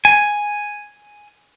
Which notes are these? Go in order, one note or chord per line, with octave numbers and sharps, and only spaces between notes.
G#5